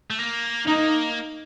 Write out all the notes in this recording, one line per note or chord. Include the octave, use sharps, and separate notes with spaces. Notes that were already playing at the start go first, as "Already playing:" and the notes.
A3
A#3
A#3 D#4